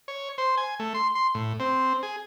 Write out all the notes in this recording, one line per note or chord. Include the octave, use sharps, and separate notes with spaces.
C#5
C5
G#5
A3
C6
C6
A2
C4
G#4